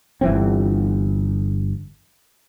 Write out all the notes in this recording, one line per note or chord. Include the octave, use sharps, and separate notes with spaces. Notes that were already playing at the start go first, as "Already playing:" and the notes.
G1 E3 C4